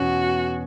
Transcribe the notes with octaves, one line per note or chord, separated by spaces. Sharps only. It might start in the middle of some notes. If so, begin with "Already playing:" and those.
Already playing: E2 B2 C#4 F#4